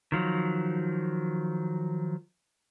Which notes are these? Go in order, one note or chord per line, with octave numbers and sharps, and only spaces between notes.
D#3 F3 F#3